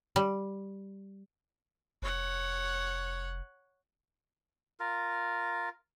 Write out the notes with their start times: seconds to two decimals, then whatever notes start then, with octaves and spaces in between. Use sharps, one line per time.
0.16 G3
2.02 F1 C#5 F#5
4.80 F4 A#4